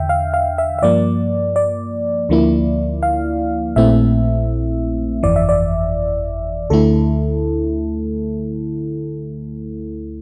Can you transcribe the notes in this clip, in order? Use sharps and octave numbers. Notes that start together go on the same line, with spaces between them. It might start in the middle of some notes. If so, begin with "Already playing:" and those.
Already playing: E2 D3 E5 G5
F5
F5
E5
E5
G2 F3 A#3 D5
D5
D2 D3 F3 A#3 E4
F5
A#1 A#2 A3 C4 E4 E5
G1 F2 E3 D5
E5
D5
D2 D3 A3 E4 A4